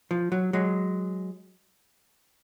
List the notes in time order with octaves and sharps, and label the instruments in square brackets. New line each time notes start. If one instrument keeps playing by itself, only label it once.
[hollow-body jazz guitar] F3
F#3
F#3 G#3